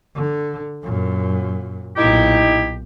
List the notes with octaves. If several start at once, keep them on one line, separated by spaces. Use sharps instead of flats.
D3
F#2 A#2
B1 A#2 D#4 E4 G4